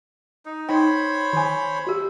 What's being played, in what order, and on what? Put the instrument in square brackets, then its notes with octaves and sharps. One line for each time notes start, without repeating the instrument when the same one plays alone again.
[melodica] D#4
[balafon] D#4 G5 [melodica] C5 C#5 B5
[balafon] D#3 G#5
F#4 G4